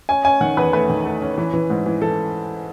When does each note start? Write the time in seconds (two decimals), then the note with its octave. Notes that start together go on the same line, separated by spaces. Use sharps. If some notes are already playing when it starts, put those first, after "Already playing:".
0.09 C#4 G#5
0.25 C#4 G#5
0.41 D#3 F#5
0.57 E2 B4
0.73 A3 B4
0.89 D#3
1.05 A3
1.22 C#4
1.38 E3
1.53 E3
1.70 G#2
1.86 E3
2.02 E3 A4